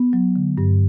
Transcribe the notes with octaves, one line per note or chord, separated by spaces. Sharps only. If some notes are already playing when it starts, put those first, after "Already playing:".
Already playing: B3
F#3
D3
G2